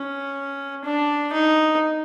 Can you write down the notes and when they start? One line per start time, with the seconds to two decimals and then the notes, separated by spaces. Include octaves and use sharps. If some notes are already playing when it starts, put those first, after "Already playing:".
Already playing: C#4
0.85 D4
1.33 D#4